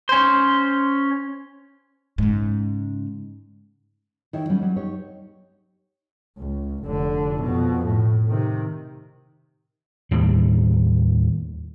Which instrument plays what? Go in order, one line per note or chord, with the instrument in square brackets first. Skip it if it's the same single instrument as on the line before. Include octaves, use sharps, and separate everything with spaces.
[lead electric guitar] C#4 C5
[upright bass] G#2 C#3
[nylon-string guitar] D#3 E4 G4 C#5
F#3 G3 C#4
F#3 G3
D#4 G4 C#5
[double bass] C#2
F1 D3
F2 B2
A2
C3 D#3
[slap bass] D#2 A2 G3